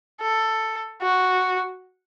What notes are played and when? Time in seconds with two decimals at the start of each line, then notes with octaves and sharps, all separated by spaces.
0.22 A4
1.02 F#4